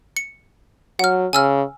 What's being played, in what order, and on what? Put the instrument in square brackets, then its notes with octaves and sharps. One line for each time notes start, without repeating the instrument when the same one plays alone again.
[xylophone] C#7
[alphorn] F#3 [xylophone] F#5 F6
[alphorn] C#3 [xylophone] G#5 E6 F6